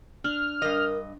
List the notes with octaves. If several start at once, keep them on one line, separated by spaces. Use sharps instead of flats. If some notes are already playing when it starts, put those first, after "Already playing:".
D4 F6
G2 A#4 D#5